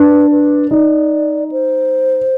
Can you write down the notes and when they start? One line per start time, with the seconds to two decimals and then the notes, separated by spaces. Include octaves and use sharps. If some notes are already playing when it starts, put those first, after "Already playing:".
Already playing: D4 B4
0.31 B4
0.71 D#4 D5
1.52 C5